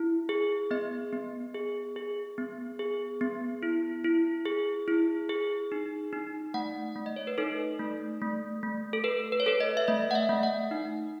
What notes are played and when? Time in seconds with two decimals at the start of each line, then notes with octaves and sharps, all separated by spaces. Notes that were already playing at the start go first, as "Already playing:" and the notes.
Already playing: E4
0.29 G#4
0.71 B3 D#5
1.13 B3
1.54 G#4
1.96 G#4
2.38 B3
2.79 G#4
3.21 B3
3.63 E4
4.04 E4
4.46 G#4
4.88 E4
5.29 G#4
5.72 D#4
6.13 D#4
6.54 A3 F#5
6.96 A3
7.06 D#5
7.16 C#5
7.27 B4
7.38 D#4 A4
7.79 A3
8.22 A3
8.63 A3
8.93 A4
9.04 A4 B4
9.32 B4
9.40 C#5
9.46 A4 B4
9.60 D#5
9.77 E5
9.88 A3 D#5
10.11 F#5
10.15 E5
10.29 A3
10.43 F#5
10.71 D#4